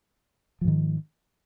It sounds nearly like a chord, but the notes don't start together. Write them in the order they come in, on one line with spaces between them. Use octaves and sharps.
F3 G#2 D#3